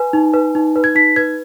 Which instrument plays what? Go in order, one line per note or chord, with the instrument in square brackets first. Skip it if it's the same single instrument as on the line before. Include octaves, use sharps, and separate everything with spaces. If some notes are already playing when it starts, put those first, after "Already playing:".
Already playing: [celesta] B4 G#5
D#4
B4
D#4
B4
G#6
D#4 B6
B4 G#6